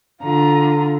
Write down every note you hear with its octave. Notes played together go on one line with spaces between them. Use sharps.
D3 F4 A#5